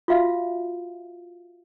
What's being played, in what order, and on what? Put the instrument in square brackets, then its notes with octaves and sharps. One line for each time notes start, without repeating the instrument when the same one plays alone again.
[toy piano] F4 F#4 E5 F5